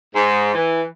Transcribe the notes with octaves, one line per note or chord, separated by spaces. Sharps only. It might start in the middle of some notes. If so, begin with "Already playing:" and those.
G#2
E3